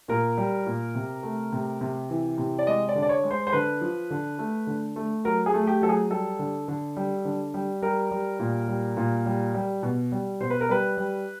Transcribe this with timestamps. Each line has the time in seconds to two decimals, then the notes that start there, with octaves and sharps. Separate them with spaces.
0.08 A#2 A#4
0.37 G3
0.66 A#2
0.95 C3
1.23 A3
1.52 C3
1.81 C3
2.10 E3
2.38 C3
2.59 D5
2.66 G#3 D#5
2.89 D5
2.95 D3
3.02 D5
3.09 C#5
3.23 G#3
3.31 C5
3.47 C5
3.53 D3 B4
3.81 F3
4.10 D3
4.39 A3
4.67 D3
4.96 A3
5.24 F#3 A#4
5.46 G#4
5.54 A3
5.67 G4
5.82 F#3 A4
5.89 G#4
6.10 G3 A4
6.39 D3
6.68 D3
6.96 G3
7.25 D3
7.54 G3
7.82 G3 A#4
8.11 G3
8.39 A#2
8.68 G3
8.97 A#2
9.26 G3
9.54 G3
9.83 B2
10.12 G3
10.40 B2 C5
10.50 B4
10.61 A#4
10.69 G3 B4
10.97 G3